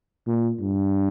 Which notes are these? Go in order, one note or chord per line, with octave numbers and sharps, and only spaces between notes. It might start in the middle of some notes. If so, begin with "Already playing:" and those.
A#2
G2